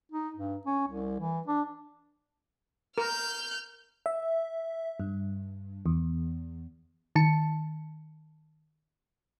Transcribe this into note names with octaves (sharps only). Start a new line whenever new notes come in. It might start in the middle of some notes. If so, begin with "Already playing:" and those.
D#4
G2
C#4
C2
E3
D4
A#4 F6 G6
E5
G2
E2
D#3 A5 C#7